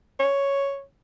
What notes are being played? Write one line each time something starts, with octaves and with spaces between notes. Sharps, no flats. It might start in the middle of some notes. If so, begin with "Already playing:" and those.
C#5